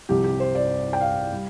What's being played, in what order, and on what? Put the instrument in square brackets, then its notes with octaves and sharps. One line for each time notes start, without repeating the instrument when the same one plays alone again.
[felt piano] C2 C3 F3 G4
G4
C5
D5
G5
F5
G3